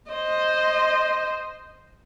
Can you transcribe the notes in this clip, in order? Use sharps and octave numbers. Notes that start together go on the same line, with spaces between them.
C5 D#5